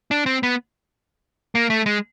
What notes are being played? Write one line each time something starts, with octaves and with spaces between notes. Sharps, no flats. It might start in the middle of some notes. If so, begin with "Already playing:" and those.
D4
C4
B3
A#3
A3
G#3